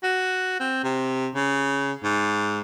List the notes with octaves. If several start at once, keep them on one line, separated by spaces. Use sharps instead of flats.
F#4
C4
C3
C#3
G#2